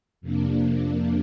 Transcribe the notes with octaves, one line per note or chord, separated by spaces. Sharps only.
F2 C3 A#3 D4